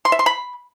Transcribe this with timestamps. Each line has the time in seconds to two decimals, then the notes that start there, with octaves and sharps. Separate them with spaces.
0.05 C6
0.12 E5
0.19 C6
0.26 B5